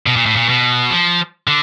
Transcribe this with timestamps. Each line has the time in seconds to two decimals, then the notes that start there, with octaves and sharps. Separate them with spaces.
0.07 B2
0.16 A#2
0.26 A2
0.36 A#2
0.49 B2
0.90 F3
1.48 D3